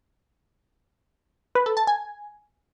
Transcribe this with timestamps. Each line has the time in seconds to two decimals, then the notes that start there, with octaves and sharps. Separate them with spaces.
1.55 B4
1.66 A4
1.77 A5
1.87 G#5